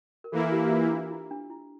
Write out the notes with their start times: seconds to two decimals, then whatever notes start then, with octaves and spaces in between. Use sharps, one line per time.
0.24 A#4
0.32 E3 A#3 E4 A4
0.52 G4
0.66 G4
0.71 F4
0.91 D4
1.11 E4
1.31 D4
1.50 E4